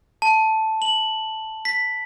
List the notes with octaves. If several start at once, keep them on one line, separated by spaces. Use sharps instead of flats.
A5
F#7
B6